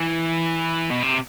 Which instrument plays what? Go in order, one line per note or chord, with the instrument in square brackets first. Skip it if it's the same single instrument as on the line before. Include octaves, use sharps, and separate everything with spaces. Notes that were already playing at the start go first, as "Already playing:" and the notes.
Already playing: [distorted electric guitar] E3
B2
C3